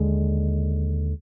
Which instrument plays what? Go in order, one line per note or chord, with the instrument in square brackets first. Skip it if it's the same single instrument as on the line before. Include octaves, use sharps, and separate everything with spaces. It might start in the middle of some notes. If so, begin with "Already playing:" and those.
Already playing: [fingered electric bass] D#2 D3 G#3